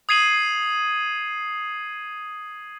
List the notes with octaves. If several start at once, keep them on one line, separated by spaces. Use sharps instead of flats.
D#6 G#6 C7 D#7 F#7